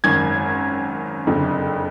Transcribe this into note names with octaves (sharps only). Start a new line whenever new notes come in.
G#1 F#2 D#3 G#6
F#1 F2 D3